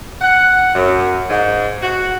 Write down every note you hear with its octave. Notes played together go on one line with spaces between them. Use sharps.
F#5
F#2
G#2
F#4